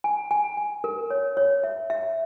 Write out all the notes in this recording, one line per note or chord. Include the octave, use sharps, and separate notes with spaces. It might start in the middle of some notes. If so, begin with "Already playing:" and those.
G#5
G#5
G#5
A#4
C#5
C#5
E5
E5